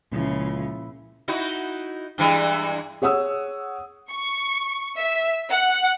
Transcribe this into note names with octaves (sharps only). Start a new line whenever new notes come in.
C#2 A#2 C#3 F3 E4
D#4 E4 F#4
G2 E3 G#3
G#4 C#5 F#5 D#6 E6
C#6
E5
F#5